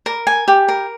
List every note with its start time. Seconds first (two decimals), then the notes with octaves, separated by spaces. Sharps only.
0.06 A#4
0.27 G#5
0.48 G4
0.68 A#4